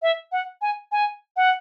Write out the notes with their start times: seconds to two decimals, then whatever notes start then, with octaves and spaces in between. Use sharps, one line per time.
0.02 E5
0.32 F#5
0.62 G#5
0.92 G#5
1.37 F#5